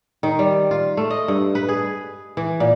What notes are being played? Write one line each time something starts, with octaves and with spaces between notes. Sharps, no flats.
D#3
G3
F4
A3
D#5
G2
B4
G#4
E3
A#2